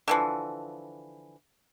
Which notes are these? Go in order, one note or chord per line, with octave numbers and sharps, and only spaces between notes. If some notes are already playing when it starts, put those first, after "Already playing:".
D3 E3 F3